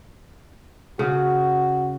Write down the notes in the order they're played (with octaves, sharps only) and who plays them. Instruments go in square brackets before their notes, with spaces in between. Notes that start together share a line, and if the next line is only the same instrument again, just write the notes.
[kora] C#3 [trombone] F#4